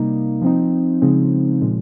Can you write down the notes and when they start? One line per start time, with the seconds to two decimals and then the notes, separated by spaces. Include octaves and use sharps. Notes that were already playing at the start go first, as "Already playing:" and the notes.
Already playing: C3 G3 A#3 D#4
0.42 F3 C4 D#4
1.02 C#3 F3 G#3 C4 D#4
1.61 A#2 F3 G#3